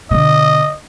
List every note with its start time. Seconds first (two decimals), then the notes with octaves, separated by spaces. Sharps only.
0.11 B2 D3 D#5